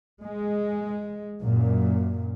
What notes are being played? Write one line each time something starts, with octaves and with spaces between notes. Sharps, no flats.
G#3
F#2 A#2